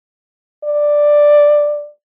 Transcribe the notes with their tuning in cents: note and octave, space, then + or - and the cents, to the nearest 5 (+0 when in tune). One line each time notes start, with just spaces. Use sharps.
D5 +5